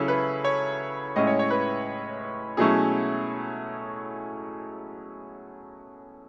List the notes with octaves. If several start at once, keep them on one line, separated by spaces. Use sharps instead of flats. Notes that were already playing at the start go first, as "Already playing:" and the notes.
Already playing: C#3 F#3 C#4 E4 A4
B4
C#5
A2 G#3 C#4 E4 D#5
C#5
C#5
B4
B2 F#3 A3 C#4 E4 G#4